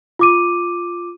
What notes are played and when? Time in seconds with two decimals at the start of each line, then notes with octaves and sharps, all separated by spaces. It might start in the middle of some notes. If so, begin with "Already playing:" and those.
0.19 F4 D6 D#7